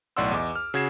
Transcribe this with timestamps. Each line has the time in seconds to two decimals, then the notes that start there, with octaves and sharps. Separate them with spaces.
0.17 B1 A2 D5 F#5 C6 E6
0.31 E2 D#5 D6
0.55 F6
0.74 C#3 F#4 G#6 C7 E7